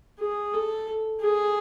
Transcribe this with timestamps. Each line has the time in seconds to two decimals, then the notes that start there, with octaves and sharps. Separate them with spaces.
0.20 G#4
0.54 A4
1.21 G#4